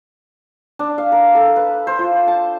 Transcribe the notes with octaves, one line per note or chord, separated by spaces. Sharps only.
D4
F5
A#4
A4
B4
C5
F4
A5